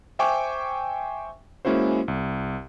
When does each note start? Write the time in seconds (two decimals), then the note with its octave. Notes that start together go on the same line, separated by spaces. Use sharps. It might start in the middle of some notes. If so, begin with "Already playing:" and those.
0.19 C5 E5 G5 G#5 C#6 D6
1.65 G#3 A#3 C#4 E4 F#4 C5
2.08 C2